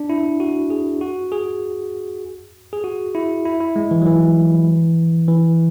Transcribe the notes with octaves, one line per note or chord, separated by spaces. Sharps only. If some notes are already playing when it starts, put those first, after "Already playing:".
Already playing: D4
E4
F#4
G#4
F#4
G#4
G#4
F#4
E4
E4
E4
G#3
E3
F#3
E3
E3